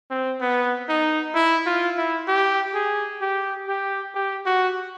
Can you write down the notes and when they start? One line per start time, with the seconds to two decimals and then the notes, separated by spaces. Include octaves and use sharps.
0.10 C4
0.41 B3
0.88 D#4
1.35 E4
1.66 F4
1.97 E4
2.28 G4
2.74 G#4
3.21 G4
3.68 G4
4.15 G4
4.46 F#4